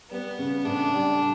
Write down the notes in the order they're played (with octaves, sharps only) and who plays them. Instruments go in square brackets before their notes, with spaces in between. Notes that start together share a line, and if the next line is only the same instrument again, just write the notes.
[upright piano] G3 [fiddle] B3
[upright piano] C#3
[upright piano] A2 [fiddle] D4
[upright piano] G3